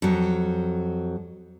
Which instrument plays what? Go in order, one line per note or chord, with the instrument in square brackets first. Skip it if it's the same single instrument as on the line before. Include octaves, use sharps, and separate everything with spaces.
[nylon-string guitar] F2 F#3